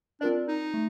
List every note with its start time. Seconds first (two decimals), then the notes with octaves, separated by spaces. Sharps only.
0.21 C4 D4 F4 A#4 D5
0.48 D#4
0.74 A3